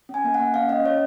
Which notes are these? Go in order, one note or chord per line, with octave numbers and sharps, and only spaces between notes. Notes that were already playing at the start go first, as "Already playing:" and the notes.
C#4 G#5
A#3
F#5
A#3
C#4 F5
C#4 D#5
C#4 C#5